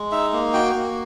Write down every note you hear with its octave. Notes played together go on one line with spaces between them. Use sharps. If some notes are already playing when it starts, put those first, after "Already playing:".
Already playing: G#3
D#4 E5
A#3
F#4 G5
A#3